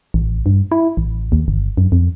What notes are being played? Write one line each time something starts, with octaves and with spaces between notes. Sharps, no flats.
A1
G2
E4
A1
D#2
G1
F#2
F2